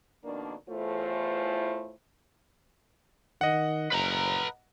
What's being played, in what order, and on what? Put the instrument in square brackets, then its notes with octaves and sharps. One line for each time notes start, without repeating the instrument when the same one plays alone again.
[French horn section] F2 B2 D#3 A#3 D4
E2 A2 E3 A3 F4 C5
[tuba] D#3 [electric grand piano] D#5 F#5
[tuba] F#1 [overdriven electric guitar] B4 A#5